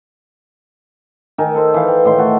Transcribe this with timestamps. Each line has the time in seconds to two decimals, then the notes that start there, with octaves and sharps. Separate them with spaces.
1.38 D#3 A#4 G#5
1.55 A4 C5
1.74 E3 F5
1.88 G5
2.05 A2 D#3 C6
2.19 F#4 A4